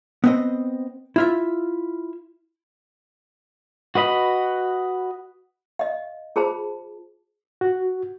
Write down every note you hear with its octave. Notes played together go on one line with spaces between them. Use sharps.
B3 C4 D#5
E4 F4 E5
F#4 B4 D#5 B5
D#5 F5
F4 G#4 C5 A5 B5
F#4